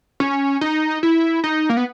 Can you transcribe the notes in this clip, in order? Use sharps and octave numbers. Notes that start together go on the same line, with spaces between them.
C#4
D#4
E4
D#4
A#3
B3